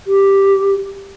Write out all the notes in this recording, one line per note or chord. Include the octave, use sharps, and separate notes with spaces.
G4